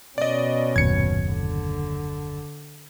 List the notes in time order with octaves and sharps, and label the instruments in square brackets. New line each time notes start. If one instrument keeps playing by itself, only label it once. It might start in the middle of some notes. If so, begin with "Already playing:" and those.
[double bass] B2 C#4 [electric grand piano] D5 D#5
[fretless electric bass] F#1 D#2 A#2 [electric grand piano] G#6 C#7
[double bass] D3